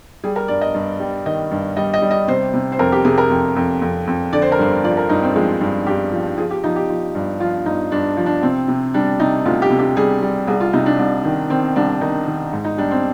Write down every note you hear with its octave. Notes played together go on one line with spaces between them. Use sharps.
G3 G#4
A#4
G2 D5
D#5
G2
G3
D#3 D#5
G2
G3 D#5
D#5
G3
D#5
C3 C5
C3
C5
F2 A#4
G4
C3 G#4
A#4
F2
F2
F2
F2
D3 D5
C5
A#4
G2 C5
F3 D5
A#4
G2 D#4
C4
F3 G#3
G2
G2 G4
F3
F3 G#4
G4
F3 D#4
G4
F3
G2
F3 F4
G2 D#4
G2 D4
F3
D4
C3 C4
C3
G3 D4
C3 D#4
D2 F4
G4
C3
G4
G3 G#4
G3
C2 G#4
F4
C3 D#4
D4
C2
D#3
D#3 C4
C2 D4
D#3 D#4
D#3
G#2
D#4
G3 D4
C4